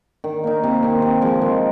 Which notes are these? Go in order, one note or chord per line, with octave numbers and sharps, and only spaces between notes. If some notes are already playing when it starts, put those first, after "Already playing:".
D#3
A#3 D#4
C3
D#3 C4 D#4
C3
F3 G#3
D#3